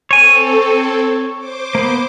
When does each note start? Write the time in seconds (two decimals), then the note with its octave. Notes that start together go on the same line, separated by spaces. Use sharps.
0.11 C4 A4 C#5 G#5
1.38 C5 D6
1.75 A#3 B3